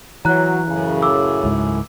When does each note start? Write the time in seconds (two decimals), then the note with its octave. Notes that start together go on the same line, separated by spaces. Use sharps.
0.25 E3 F#3 A#5 F#6
0.68 F#2 A2 C#3
1.02 D6 E6
1.44 C#2 G#2